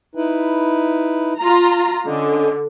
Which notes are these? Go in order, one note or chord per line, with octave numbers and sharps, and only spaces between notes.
D#4 E4 B4
F4 A#5
D3 C#4 D#5